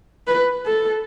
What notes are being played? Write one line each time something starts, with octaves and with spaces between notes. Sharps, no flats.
B4
A4